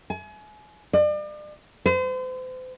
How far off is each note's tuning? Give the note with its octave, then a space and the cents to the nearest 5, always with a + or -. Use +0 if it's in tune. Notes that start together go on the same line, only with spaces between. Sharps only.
G#5 +35
D5 +40
C5 -40